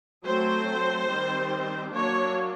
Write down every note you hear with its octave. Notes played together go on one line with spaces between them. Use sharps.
F#3 A3 C4 C5
D#3 G3 C4
F#3 A#3 D4 C#5